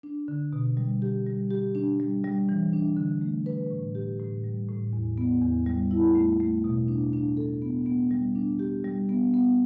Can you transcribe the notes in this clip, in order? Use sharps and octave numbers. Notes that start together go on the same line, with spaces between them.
D4
D3
B2
G3
G4
G3
G4
D4
G3
G3
E3
D4
D3
A3
B4
A2
G4
A2
G3
A2
E2
B3
E2
G3
E4
A3
A3
B2
D4
D4
A4
B3
B3
G3
D4
G4
G3
B3
B3